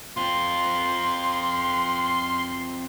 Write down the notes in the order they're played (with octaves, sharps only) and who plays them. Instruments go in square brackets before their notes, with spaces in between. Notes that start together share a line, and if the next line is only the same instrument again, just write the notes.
[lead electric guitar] C4 F4 [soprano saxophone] C6